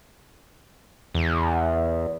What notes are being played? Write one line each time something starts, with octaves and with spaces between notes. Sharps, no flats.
E2